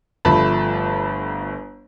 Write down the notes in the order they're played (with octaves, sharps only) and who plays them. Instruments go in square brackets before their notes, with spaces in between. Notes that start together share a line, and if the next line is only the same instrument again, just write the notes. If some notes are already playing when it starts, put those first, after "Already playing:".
[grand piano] G1 F3 A3 A5 B5